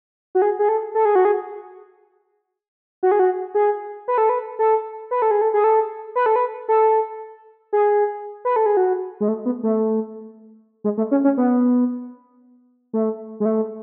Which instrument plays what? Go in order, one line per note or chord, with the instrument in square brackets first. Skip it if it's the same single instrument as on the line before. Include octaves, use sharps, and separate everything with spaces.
[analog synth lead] F#4
G#4
G#4
A4
A4
G#4
F#4
G#4
F#4
G#4
F#4
G#4
B4
A4
B4
A4
B4
A4
G#4
A4
G#4
A4
B4
A4
B4
A4
G#4
B4
A4
G#4
F#4
G#3
A3
B3
A3
G#3
A3
C#4
C#4
B3
A3
G#3
A3